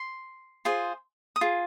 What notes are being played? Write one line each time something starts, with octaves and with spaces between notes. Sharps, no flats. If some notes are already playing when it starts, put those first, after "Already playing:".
Already playing: C6
F4 G#4 C5
D#6
F4 G#4